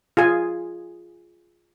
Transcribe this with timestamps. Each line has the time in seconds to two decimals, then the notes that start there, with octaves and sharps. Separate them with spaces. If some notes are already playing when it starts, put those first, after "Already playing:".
0.17 F4 G#4 G#5